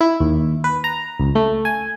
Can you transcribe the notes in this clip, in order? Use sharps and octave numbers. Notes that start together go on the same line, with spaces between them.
E4
D#2
B4
A#5
C#2
A3
G#5